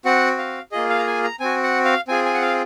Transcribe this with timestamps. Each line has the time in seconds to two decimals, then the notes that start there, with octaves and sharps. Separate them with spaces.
0.05 C4 F#4 F#5
0.38 F5
0.72 A#3 F4 G#4 D#5
0.90 F5
0.99 A#5
1.07 G#5
1.24 A#5
1.40 C4 F#4 G#5
1.63 F#5
1.85 F5
2.08 C4 F4 G#4 G#5
2.25 G#5
2.34 F#5
2.42 F5